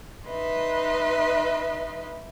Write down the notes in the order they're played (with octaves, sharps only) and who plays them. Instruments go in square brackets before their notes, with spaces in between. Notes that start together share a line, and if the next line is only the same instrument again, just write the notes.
[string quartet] D#4 B4 D#5 E5 C6